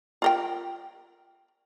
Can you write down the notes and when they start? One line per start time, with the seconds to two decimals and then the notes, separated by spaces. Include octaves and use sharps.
0.22 F4 A#4 G5